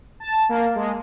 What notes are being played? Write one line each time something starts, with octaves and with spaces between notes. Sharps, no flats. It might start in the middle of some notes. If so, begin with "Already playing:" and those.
A5
A#3
G#3